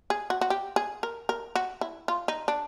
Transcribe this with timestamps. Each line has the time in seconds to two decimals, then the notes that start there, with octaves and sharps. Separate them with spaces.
0.10 G#4
0.30 F#4
0.41 F#4
0.50 G4
0.76 G#4
1.03 A#4
1.29 A#4
1.56 F#4
1.81 E4
2.08 F4
2.28 D#4
2.48 D4